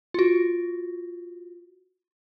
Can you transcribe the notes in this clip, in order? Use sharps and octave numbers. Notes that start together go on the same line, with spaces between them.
F4 F#4